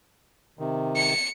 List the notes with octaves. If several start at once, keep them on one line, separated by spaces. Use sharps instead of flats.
C3 D#3
C#7